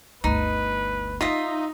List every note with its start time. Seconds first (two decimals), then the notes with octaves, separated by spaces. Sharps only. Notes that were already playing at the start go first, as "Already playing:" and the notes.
0.24 G1 D2 D#4 B4
1.21 D#4 F4 D#5 E5